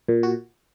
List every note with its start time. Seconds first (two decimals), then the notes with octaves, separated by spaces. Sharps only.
0.08 A#2
0.23 F#4